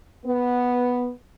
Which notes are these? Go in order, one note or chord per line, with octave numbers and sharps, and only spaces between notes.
B3